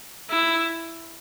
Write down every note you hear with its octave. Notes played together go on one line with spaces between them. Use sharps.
E4